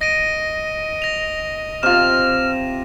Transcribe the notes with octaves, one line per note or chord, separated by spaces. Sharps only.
D#5 A#6 D7 D#7
A#6 F7
C3 F4 F6 E7